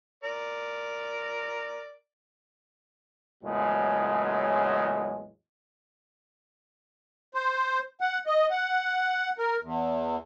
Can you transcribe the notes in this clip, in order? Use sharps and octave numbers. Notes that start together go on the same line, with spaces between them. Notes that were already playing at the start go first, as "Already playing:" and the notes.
A#4 D5
A#1 E2 A2 C#3 F#3 G#3
C5
F#5
D#5
F#5
A#4
E2